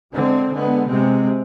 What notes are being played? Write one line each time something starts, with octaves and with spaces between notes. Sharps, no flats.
D3 G#3 C4
D3 G#3 B3
C3 G#3 C4